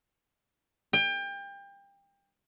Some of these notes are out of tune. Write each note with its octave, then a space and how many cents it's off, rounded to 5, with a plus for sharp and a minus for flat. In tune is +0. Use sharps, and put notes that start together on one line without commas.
G5 +30